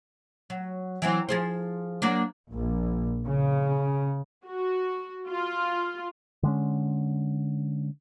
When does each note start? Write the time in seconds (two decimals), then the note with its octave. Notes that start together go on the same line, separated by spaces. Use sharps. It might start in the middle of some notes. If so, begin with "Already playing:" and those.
0.50 F#3
1.02 E3 F#3 C4
1.29 F3 G#4 C5
2.02 F#3 A#3 D4
2.53 A#1
3.26 C#3
4.47 F#4
5.30 F4
6.43 D3 G#3 C#4